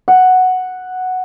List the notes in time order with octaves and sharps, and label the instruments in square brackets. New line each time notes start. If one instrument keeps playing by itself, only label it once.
[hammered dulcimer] F#5